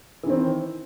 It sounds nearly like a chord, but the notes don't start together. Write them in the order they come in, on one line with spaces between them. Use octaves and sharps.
E3 D#3 C4